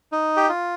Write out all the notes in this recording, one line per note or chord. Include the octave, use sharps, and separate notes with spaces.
D#4
G4
F4